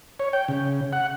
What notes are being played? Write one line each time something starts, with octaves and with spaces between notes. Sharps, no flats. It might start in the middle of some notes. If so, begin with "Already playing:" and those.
C#5
G5
C#3
F#5